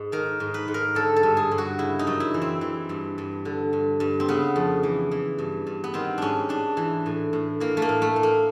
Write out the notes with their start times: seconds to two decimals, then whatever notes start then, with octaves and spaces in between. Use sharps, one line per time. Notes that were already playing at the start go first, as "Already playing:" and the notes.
Already playing: G#2
0.12 D#3 A#4
0.40 G#2
0.54 B4
0.68 G#2
0.74 A#4
0.95 D3 A4
1.16 A4
1.23 G2
1.37 G#4
1.52 G2
1.58 F#4
1.79 C#3 E4
1.99 D#4
2.07 F#2
2.20 E4
2.34 E3
2.42 C4
2.61 E3
2.89 G2
3.18 G2
3.45 D3
3.73 G2
4.00 G2
4.20 C4
4.28 C#3 B3
4.56 F2
4.83 E3
5.11 E3
5.39 G2
5.67 G2
5.84 B3
5.94 D#3 C4
6.18 G#2 C#4 D4
6.49 G#2 D4
6.77 E3
7.06 A2
7.33 A2
7.60 E3 A#3
7.77 A3
7.82 A#3
7.89 A2
8.02 A3
8.16 A2
8.23 A#3